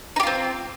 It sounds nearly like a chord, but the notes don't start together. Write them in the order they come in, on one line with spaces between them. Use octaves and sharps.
D#4 G4 F4 C4